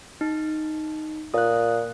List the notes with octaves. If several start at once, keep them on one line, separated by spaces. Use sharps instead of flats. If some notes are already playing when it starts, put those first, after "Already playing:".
D#4
A#2 D#6 F#6